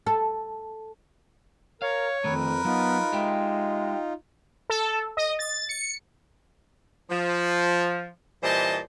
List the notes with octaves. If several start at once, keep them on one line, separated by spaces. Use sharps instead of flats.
A4
A#4 C#5 F5
F2 D3 D#3 A3 A#4 B4
F#3 B3 D#4 F4
G#3 G4 E5 G5
A4
D#5
A6
C#7
F3
A#2 E3 G3 C5 D#5 A5